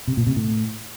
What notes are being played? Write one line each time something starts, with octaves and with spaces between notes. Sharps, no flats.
C3
A#2
C3
A2